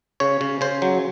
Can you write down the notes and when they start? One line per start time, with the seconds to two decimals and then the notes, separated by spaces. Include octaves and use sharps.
0.20 C#3 C#5
0.41 C#3
0.61 C#3 C5
0.82 F#3